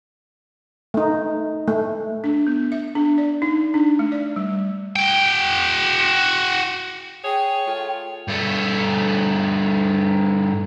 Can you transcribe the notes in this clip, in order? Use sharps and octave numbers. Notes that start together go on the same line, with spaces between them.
A3 D#4
A3
D4
B3
E5
D4
D5
D#4
D4
A3
D5
G3
F#4 G5
G#4 C#5 G5
A3 F4
G2 A3